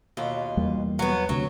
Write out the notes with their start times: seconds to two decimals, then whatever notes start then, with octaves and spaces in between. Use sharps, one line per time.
0.17 D#2 B2 F4
0.57 E2 G3 A#3
0.99 F#3 B3
1.29 D2 C3 F#3